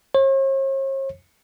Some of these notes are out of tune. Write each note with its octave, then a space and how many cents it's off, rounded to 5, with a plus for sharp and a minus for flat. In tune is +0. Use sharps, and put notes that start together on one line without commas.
C#5 -45